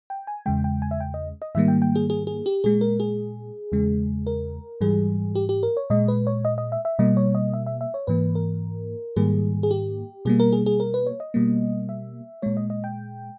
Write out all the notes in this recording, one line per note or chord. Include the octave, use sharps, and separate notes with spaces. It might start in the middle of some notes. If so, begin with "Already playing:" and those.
G5
G#5
E2 C#3 G#3 G5
G5
G#5
E5
G5
D#5
D#5
G#2 D#3 G3 A#3 E5
G5
G5
G#4
G#4
G#4
G4
A#2 G#3 G#4
A#4
G#4
E2 C#3 G#3
A#4
G#2 E3 G3 G#4
G4
G4
A#4
C#5
A#2 G#3 D#5
B4
C#5
D#5
D#5
E5
E5
B2 G3 A#3 D#5
C#5
D#5
E5
E5
E5
C#5
G#2 E3 A#3 B4
A#4
G#2 D#3 G3 A#3 G#4
G#4
G4
B2 G3 A#3 G#4
A#4
G#4
G#4
A#4
B4
C#5
D#5
B2 G3 A#3
E5
A#2 G#3 C#5
D#5
D#5
G5